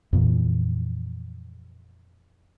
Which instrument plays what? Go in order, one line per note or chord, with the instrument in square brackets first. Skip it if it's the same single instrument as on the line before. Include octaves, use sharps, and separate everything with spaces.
[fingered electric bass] F2 A#2 E3